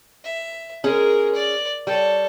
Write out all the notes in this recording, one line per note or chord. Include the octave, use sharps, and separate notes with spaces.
E5
G#3 C#4 G#4 A#4
D5
G3 A4 C#5